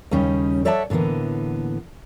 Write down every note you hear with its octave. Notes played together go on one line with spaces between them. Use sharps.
D#2 C#3 G3 C#4 D#4
A4 C#5 D5 E5 F#5 A5
A2 D3 E3 A#3 B3